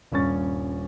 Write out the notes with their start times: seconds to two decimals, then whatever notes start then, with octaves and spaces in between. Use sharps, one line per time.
0.12 D#1 G2 C#4 C#6 A6